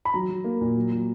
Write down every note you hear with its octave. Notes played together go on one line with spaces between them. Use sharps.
B5
F#3 A#5
F#3
A#3
A#2
F#3
F#3